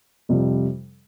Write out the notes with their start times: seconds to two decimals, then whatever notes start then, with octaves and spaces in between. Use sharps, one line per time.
0.29 F2 C3 G3